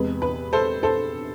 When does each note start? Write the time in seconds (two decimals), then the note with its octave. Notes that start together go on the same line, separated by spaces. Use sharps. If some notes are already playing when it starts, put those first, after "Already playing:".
Already playing: E2 C3 G#3 B4
0.22 B4
0.53 A4 C5
0.83 A4 C5